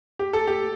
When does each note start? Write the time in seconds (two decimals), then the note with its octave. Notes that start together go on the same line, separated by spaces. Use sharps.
0.19 G4
0.33 A4
0.47 G4